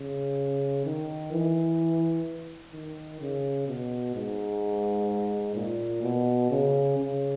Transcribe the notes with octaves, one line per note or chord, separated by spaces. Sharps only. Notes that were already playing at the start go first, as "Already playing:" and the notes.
Already playing: C#3
D#3
E3
D#3
C#3
B2
G#2
A#2
B2
C#3
C#3